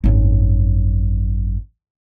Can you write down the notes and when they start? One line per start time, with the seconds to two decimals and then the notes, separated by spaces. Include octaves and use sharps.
0.04 G#1 F#2